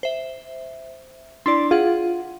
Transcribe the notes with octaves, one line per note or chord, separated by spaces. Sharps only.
C5 E5
D4 E4 D5 C6
F4 G#4 F#5